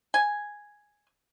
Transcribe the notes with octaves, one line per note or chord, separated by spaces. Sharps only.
G#5